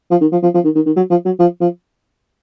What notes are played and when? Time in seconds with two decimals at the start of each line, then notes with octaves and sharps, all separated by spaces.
0.11 F3
0.21 D#3
0.32 F3
0.43 F3
0.54 F3
0.64 D#3
0.75 D#3
0.86 D#3
0.96 F#3
1.10 F3
1.25 F#3
1.39 F3
1.61 F3